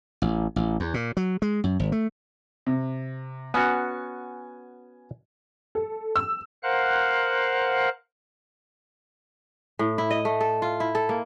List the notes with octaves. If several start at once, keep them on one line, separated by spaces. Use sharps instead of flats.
A1
A1
E2
A#2
F#3
G#3
F#2
G#1
A3
C3
B3 C#4 F#4 G#5
A4
E6
A#4 C5 F5 F#5 F#6
A2
E4
D#5
A3
A4
F4
E4
A4
A#3